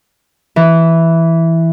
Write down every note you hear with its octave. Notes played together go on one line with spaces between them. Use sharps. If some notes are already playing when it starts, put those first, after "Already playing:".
E3